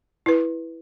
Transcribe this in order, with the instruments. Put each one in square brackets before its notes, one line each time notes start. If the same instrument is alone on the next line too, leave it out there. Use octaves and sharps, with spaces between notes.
[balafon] E4 B4